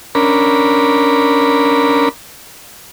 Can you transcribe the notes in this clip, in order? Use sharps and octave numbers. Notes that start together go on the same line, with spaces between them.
C#4 D4 A#4 B5